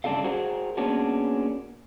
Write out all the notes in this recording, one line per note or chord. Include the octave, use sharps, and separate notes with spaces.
G2 C#3 D4 D#4 A4 F5
F#4 G#4 A#4 C5 F#5
A#3 B3 C#4 D4 F#4 G#4